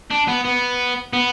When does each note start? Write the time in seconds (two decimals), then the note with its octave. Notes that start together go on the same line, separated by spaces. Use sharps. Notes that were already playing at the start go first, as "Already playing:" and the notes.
0.11 D4
0.28 B3
0.45 B3
1.13 B3